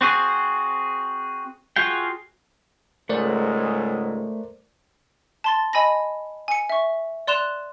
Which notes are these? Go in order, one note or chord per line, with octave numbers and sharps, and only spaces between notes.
C4 F#4 G#4
F4 F#4 G#4 F5 G5
C#2 G#2 G#3 A3 A#4 C5 D5 F#5
A5 C6 A6
D#5 G#5 B5 A#6
G#5 C#7
E5 C#6
D5 C6 F#6 E7 F7